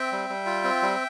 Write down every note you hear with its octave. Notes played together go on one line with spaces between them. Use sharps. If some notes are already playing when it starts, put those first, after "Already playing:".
Already playing: C4 E5 G5
G3
G3
F4
C4
G3